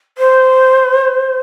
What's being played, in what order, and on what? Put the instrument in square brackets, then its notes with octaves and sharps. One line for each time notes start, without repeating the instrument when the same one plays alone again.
[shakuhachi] C5